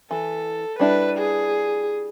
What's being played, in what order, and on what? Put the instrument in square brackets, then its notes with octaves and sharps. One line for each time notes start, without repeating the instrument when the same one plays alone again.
[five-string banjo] E3 [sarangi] A4
[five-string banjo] G3 D4 E4 [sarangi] B4
[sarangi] G#4